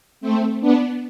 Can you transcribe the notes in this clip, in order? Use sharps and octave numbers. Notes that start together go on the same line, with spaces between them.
A3 C4
B3 D4